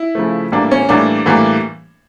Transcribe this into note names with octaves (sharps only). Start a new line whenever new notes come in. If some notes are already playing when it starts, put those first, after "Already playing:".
Already playing: E4
C#3 F3 A3
A2 E3 G3 A#3 D4
C#4
A2 E3 G3 A#3 D4
A2 E3 G3 A#3